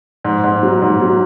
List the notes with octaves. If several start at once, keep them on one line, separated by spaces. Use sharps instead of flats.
G#2
G#2
F#3
G#2
F#3